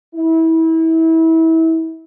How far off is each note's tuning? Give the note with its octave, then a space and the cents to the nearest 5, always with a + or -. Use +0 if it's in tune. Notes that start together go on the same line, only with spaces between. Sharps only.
E4 -25